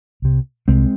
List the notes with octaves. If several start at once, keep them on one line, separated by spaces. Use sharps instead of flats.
C2 C3
C2 C3 G#3 C4